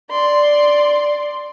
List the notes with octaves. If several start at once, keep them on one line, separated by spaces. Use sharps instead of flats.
D5 C6